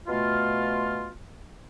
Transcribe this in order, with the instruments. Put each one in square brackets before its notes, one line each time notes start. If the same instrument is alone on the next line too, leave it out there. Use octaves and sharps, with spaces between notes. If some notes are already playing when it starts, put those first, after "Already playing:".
[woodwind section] B2 A3 F4